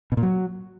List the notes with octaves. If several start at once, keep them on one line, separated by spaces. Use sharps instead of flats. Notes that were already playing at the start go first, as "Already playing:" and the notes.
B2
A#2
F#3